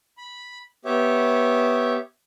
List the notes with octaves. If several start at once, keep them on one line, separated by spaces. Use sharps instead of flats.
B5
B3 G4 C#5 E5